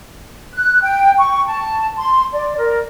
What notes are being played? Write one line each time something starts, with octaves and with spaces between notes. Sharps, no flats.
F#6
G5
C#6
A5
C6
D5
A#4